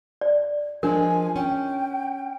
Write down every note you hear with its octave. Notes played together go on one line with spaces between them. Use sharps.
D5
F3 G#3 D4 A#4 G#5
C#4 G5